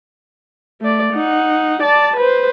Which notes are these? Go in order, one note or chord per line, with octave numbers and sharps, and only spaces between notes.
A3 D5
D#4 F#5
D5 A5
B4 C5